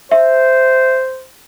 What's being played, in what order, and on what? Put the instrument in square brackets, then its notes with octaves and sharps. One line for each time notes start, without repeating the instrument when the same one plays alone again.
[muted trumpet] C5 [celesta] E5